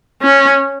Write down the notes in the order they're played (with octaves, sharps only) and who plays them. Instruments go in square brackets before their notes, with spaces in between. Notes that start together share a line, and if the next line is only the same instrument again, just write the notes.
[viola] C#4